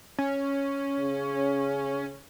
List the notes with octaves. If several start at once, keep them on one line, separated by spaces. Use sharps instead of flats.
C#4
C#3